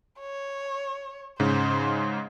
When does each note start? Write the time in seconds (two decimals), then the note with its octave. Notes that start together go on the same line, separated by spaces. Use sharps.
0.20 C#5
1.40 G#2 C#3 C5